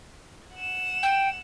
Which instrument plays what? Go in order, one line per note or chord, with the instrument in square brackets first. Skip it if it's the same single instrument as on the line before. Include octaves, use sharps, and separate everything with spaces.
[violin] F#5 E7
[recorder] G5